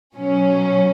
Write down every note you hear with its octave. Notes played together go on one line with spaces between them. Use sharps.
B2 F#3 C#4